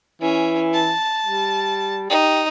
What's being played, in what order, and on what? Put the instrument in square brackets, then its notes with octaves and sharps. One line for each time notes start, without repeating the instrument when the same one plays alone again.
[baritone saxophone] E3 [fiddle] C#4
[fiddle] A5
[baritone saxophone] G3
[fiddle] D#4 [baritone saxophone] G4